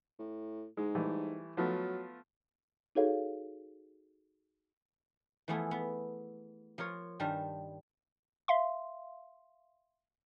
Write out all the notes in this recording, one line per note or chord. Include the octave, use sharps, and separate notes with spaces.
A2
G#2 G#3
E3 G3 A3
F3 F#3 A3 B3
D#4 F#4 G#4 A4 C#5 F5
E3 F3 A3 B3 G#4 A4
B3
F3 F4 A#4 C#5
G2 D#3 G3 A#4 A5
E5 F5 C6